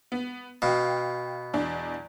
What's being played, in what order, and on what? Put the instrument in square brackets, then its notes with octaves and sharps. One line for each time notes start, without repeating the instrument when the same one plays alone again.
[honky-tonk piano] B3
[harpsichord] B2 [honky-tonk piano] F5 G5
[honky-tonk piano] E2 D4